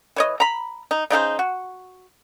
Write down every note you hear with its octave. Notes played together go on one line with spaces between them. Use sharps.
E3 C#5 D#5
A#5 B5
D#4
C#3 D#4 F4 C5
F#4